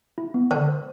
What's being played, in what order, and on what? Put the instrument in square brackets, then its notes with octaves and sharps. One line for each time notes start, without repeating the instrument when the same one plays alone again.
[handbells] E4
B3
[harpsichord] D3 [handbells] C5
[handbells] C5